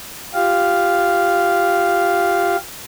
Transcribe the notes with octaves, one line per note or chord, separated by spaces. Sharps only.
F4 G4 F5